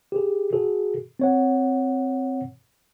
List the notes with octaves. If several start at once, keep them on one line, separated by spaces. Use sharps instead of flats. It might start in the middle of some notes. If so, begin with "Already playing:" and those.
G4 G#4
F#4 G#4 A4
C4 C#5 F#5